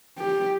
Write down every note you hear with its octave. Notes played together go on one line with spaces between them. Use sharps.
G4